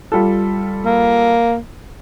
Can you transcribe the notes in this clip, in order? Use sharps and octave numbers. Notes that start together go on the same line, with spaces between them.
G3 F4 A4
A#3